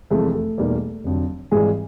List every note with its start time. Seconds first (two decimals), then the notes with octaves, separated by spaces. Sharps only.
0.10 F1 F2 C3 E3 G#3 A3 G#4
0.34 A3 A4
0.58 E2 B2 G3 A#3 D#4
1.04 F1 F2 D3 F#3
1.51 G#1 G#2 E3 G3 G#3 G#4